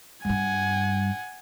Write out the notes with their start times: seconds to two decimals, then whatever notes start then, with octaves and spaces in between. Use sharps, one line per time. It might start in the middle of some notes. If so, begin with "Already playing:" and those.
0.25 G2 G3 F#5 G#5